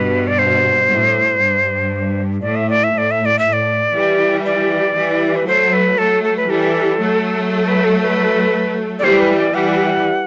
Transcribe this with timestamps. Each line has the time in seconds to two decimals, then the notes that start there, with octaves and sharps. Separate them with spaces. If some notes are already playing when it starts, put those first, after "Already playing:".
Already playing: G2 B2 B4
0.27 D5
0.39 C5
0.89 A2
1.40 G2
2.42 A2 D5
2.56 E5
2.70 D5
2.84 E5
2.93 A2 D5
3.11 E5
3.25 D5
3.39 E5
3.44 A2
3.53 D5
3.94 E3 G3
4.45 D5
4.96 E3 G3
5.36 B4
5.47 F#3 A3 C5
5.73 B4
5.98 F#3 A3 A4
6.24 A4
6.37 B4
6.49 E3 G3 A4
7.00 F#3 A3
7.51 A4
7.62 A4
7.68 B4
7.84 A4
8.02 B4
8.99 D5
9.03 E3 G3 C5
9.20 B4
9.37 D5
9.54 E3 G3 F#5